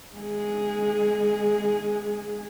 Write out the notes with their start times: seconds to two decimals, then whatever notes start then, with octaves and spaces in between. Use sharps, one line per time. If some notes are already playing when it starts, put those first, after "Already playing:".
0.15 G#3 G#4